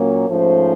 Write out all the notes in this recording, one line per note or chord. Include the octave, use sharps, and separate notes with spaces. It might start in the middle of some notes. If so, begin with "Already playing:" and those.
Already playing: A#2 F#3 A#3 C#4
G#2 F3 A3 C#4 C5